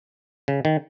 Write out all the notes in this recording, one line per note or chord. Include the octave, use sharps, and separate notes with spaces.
C#3
D#3